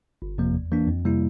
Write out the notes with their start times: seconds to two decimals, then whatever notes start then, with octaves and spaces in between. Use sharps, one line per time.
0.22 G1
0.38 F2 C3 F3 A#3
0.54 E2
0.72 E3 A#3 D4
0.88 F2
1.05 C3 G3 A#3 E4